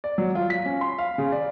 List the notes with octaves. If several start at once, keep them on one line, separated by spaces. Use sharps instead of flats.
D5
F#3
F4
B6
C#4
C6
F5
C#3
D5